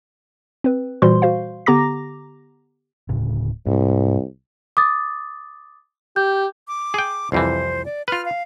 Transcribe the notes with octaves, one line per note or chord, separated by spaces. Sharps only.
C4 B4
A#2 E3 G3 F#4 C5 C6
F#4 C5 F5
D3 B3 G4 A#5 D6 A#6
D1 A2 C#3
C2 G#2
D6 D#6 A6
G4 G6
D6
G#4 G5
C2 F2 E3 C5
D5
F4 B4 F6
F5